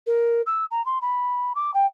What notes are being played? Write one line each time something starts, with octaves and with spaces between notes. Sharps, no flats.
A#4
E6
A#5
C6
B5
D6
G5